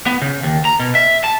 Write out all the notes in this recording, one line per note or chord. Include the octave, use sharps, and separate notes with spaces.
B3
C#3
D#2
A#5
B2
E5
A5